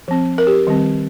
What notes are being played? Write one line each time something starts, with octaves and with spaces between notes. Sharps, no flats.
F3 C4
A#4
G4
D#3 G3 C4